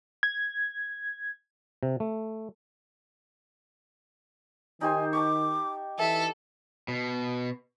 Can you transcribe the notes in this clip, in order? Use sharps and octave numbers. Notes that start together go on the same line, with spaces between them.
G#6
C3
A3
D#3 D#4 G4 C5 G#5
A5 C#6 D6
E3 A4 E5
B2